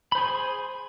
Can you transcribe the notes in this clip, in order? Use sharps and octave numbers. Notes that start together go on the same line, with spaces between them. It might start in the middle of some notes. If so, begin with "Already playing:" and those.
G#4 C5 B5 C6